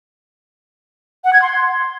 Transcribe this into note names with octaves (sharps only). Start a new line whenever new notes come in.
F#5
G#6
C6